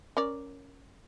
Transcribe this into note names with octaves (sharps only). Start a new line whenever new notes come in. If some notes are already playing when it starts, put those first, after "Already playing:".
C#4 A#4 D5